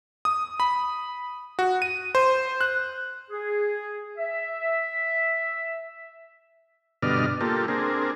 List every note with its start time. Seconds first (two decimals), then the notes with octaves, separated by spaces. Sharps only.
0.25 D#6
0.60 B5
1.59 F#4
1.82 D#7
2.15 C5
2.61 F#6
3.30 G#4
4.18 E5
7.02 G2 B2 D3 D5 D#5 F6
7.41 A#3 F4 G4 A4
7.68 C4 D4 G#4 A#4